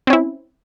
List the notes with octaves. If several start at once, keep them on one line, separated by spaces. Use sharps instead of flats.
C4 C#4 E4